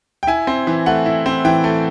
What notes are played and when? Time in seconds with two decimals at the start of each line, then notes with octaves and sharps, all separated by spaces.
0.23 G5
0.27 E4 G#5
0.47 C4
0.67 E3
0.86 A3 F#5
1.06 E4
1.26 C4
1.45 E3 G5
1.64 A3